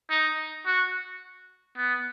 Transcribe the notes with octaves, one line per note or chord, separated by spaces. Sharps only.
D#4
F#4
B3